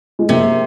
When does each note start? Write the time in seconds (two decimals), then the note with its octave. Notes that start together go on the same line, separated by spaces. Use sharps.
0.19 G#3
0.29 C3 A#3